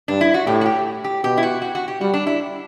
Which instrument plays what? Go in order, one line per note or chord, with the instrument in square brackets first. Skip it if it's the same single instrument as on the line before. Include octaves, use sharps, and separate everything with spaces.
[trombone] G2 [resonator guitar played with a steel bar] D4
[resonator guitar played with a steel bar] E4
F#4
[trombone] A2 [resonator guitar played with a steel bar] G4
[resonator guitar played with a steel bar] F#4
G4
G4
[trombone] B2 [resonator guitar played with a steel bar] G4
[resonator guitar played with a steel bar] E4
F#4
F#4
F#4
G4
[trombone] G3 [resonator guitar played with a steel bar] F#4
[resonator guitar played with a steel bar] D4
E4